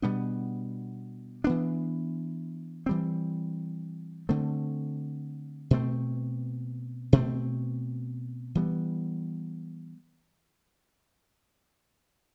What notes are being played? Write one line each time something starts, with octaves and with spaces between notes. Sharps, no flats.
B2 G3 B3 D4
E3 B3 D4
E3 G3 C4
D3 A3 C4
B2 A3 C4
B2 A3 C4
E3 G3 B3